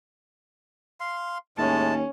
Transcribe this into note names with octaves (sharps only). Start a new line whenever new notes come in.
F5 C6
D#2 A2 G#3 C#4 A5